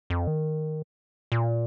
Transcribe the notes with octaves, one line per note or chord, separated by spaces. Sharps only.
F2
D#3
A#2